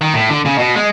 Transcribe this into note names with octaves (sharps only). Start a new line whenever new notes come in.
D#3
A2
D3
C#3
B2
G#3